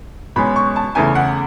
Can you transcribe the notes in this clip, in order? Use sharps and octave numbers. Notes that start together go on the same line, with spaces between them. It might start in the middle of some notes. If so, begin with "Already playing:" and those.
B2 G#3 C#4 B5
C#6
A5
E2 C#3 E3 A3 G#5
F#5